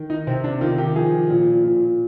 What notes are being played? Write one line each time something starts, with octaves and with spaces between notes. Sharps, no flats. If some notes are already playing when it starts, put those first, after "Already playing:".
Already playing: D#3
D#4
C3 C4
D4
D#3 F4
G4
F3 G#4
A#2
A#2